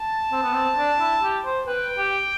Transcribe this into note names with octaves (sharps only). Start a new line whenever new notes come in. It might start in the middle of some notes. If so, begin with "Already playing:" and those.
Already playing: A5
C4
B3
C4
D4
E4
G4
C5
B4 G5
G4